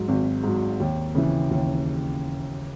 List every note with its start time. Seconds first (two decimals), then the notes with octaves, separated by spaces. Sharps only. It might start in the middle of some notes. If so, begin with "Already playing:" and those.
Already playing: G#2 F#3
0.08 G#1
0.43 G#2 F#3
0.80 D#2
1.15 C#3 E3
1.51 D#2